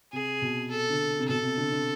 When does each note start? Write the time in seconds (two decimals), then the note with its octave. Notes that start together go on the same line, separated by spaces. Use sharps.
0.13 C3 G#4
0.42 B2
0.71 A4
0.90 D3
1.19 C3
1.28 B2 A4
1.42 C3
1.57 D3
1.72 D3